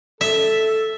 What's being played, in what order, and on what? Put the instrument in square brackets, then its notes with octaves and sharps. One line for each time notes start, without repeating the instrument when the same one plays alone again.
[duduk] A4 [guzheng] E5